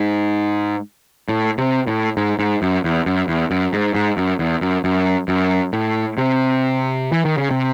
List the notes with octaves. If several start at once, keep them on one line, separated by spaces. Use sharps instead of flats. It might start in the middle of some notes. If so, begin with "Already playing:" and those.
Already playing: G#2
A2
C3
A2
G#2
G#2
F#2
E2
F#2
E2
F#2
G#2
G#2
F#2
E2
F#2
F#2
F#2
A2
C3
E3
D#3
C#3
C3